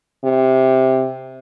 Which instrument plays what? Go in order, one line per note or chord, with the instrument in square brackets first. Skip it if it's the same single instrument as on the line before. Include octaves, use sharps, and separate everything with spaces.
[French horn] C3